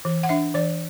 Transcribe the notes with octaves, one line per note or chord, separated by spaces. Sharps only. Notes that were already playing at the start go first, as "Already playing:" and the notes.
E3
F#5
D4 E5
E3 D5